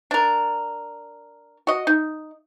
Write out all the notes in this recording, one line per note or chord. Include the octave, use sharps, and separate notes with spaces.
D4 A#4
F#4 D#5
D#4